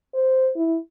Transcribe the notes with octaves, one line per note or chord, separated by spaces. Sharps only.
C5
E4